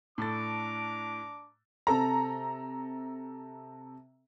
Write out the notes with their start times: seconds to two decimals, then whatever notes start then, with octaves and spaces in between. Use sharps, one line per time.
0.18 A2 D4 A4 A#5 D6 A6
1.87 C3 A4 A#5